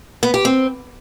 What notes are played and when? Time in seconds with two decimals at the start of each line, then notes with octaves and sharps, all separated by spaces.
0.23 B3
0.34 G4
0.45 C4